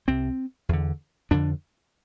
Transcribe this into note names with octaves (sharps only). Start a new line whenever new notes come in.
C2 C3 C4
E2 D3
F2 D3 D4